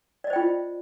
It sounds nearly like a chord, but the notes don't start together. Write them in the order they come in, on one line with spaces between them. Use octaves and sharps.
D5 D#5 C5 G5 F4